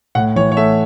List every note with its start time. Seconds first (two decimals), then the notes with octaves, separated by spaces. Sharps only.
0.15 A2 F#5
0.36 E3 C#5
0.52 C#5
0.57 A3 E5